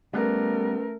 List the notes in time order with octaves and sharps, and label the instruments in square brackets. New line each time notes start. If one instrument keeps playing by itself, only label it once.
[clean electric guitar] G3 B3 [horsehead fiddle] A3 A#4 [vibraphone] C#4 B4